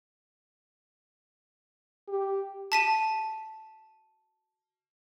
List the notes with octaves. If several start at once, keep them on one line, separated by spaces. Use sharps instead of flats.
G4
A5 B6 D#7